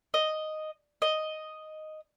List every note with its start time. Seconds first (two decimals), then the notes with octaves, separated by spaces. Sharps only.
0.14 D#5
1.02 D#5